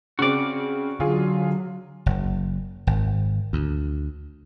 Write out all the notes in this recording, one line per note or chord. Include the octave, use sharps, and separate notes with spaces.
C#3 C4 F#4 D5
D3 F#3 F4 G#4
F#1
G#1
D2